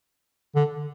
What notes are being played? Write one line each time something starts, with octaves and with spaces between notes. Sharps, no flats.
D3